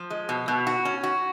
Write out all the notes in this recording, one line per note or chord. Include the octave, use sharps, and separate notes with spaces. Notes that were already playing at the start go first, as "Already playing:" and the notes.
Already playing: F3
G#3
B2
B2
F#4
C#4
F#4